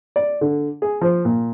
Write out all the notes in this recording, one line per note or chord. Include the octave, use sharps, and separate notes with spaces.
D5
D3
G#4
F3
A#2